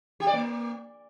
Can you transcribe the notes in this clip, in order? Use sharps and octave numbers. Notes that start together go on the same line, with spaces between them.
G4
D5
A#3